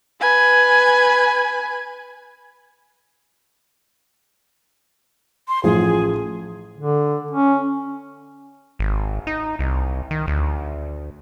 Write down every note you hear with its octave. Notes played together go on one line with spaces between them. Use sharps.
B4 G#5
C6
A1 F3 G#4
D3
C#4
G#1
D#4
C2
D#3
D2